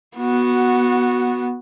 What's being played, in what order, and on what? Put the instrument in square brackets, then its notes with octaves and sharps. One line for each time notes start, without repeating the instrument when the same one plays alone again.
[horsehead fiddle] B3 F#4